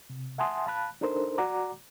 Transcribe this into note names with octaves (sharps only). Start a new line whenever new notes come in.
C3
E5 F#5 G#5 A5 C6 D#6
F5 A5 B5 F#6
D4 D#4 A4 A#4 C5
F#4 D5 F#5 A#5 D6